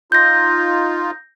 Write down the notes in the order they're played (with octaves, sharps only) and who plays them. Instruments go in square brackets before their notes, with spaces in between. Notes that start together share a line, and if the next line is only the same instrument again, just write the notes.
[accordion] D#4 F4 [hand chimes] G6 A#6